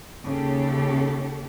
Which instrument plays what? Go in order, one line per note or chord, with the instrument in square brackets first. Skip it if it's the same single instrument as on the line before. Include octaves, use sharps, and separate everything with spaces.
[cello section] D#2 C#3 G4 A4